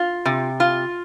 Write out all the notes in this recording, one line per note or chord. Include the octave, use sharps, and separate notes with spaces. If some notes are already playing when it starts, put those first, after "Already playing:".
Already playing: F4
C3
F4